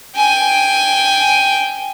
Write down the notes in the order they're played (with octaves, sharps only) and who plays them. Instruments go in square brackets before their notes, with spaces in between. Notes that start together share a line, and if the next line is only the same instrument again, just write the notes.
[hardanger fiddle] G5 G#5